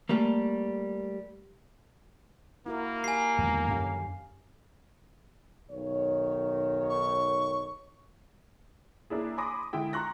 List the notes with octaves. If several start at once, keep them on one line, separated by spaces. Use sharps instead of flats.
G3 A3 A#3
A#3 E4 F#4 A#4
G4 G#5 C7
E2 D3 D#3 F3 G#3 B3
F#2 C#4 G4 F5
B1 D#3 C#5
C#6
A#3 D4 E4 G#4
G#5 B5 C6 D6 D#6 A#6
D3 G#3 E4 G5
A#5 C6 C#6 F#6 A#6